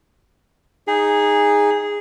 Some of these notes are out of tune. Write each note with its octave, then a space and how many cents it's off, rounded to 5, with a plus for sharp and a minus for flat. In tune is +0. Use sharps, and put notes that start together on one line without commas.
D#4 +0 G#4 -10